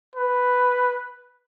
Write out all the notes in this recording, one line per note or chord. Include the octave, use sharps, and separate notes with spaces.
B4